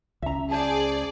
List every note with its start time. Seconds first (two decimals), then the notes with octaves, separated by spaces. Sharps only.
0.22 C#2 C#4 E5 A#5
0.51 G#4 C5 D5 A5